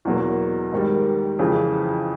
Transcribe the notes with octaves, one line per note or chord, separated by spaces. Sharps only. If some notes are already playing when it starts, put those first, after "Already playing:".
E2 B2 F#3 A#3
G#2 D#3 G3
F2 C#3 E3